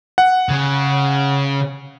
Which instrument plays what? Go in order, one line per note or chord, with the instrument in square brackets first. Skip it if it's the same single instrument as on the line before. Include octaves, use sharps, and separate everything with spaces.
[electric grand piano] F#5
[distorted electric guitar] C#3